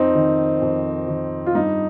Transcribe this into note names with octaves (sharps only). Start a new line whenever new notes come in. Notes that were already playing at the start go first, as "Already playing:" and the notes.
Already playing: F2 C4 D#4
D#3
F2
D#3
F4
G2 D#4